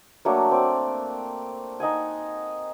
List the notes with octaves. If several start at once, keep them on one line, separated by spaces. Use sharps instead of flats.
F#3 A3 A#3 D4
C4 D5
D#4 D#5 F#5 G#5